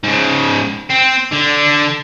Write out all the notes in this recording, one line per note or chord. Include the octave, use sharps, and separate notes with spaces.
G#2 C#3
C4
D3 D4